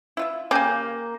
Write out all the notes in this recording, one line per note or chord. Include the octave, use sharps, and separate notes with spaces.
E4 F4 E5
C#3 A#3 C#4 G4 G#5 G6